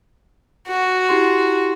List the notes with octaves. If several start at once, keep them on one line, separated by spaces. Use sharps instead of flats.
F#4
E4 G4 C6